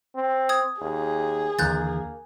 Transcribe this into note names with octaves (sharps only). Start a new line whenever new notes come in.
C4
D#6 G#6
D#2 G#4
D#2 D3 E3 A#3 F#6 G6 A6